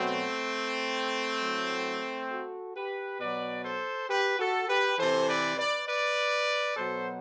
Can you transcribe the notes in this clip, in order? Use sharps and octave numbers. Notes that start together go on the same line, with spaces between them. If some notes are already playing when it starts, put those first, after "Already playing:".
Already playing: B2 F#3 A3 C4
A2 F#3
F#4 A4
G4 B4
B2 F#3 B4 D5
A4 C5
G4 B4
F#4 A4
G4 B4
C3 E3 A4 C5
B4 D5
B4 D5
B4 D5
B2 F#3 A4 C5